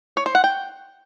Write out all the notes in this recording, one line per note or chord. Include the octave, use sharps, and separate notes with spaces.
C#5
C5
F#5
G5